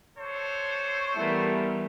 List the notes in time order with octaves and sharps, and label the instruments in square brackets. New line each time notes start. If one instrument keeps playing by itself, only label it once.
[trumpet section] D4 A4 C5 [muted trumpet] C#5
[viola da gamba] E3 G3 B3 [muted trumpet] A3 [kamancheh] E4 A#4